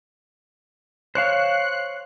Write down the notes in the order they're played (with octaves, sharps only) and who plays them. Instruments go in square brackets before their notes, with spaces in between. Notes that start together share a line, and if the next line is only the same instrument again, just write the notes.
[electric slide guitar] C5 C#5 F5 [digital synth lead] F#6